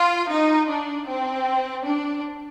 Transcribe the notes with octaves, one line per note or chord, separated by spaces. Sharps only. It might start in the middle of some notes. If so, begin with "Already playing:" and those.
Already playing: F4
D#4
D4
C4
D4